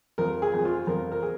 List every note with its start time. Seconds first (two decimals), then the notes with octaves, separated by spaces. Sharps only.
0.18 F2 A#4
0.42 G#4
0.54 F2
0.65 F4
0.87 F2 A#4
1.12 A#4
1.23 G#4